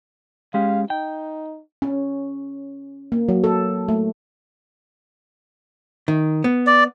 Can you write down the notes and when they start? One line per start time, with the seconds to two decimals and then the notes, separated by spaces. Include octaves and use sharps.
0.54 G#3 C#4 G4 F5
0.90 D#4 G5
1.82 C#4
3.12 A#3
3.29 F#3
3.44 A4
3.89 A3
6.08 D#3
6.44 B3
6.67 D5